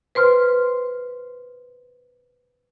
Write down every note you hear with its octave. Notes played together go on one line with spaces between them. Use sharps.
B4 C5 C6 F6